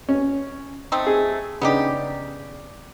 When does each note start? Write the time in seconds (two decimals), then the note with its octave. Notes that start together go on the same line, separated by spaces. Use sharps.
0.09 C#4
0.92 A3 C4 D#4
1.07 G#4
1.61 C#3 B3 D4 D#4 G4